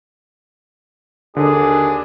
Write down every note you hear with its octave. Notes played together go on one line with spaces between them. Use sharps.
D#2 D3 D4 G#4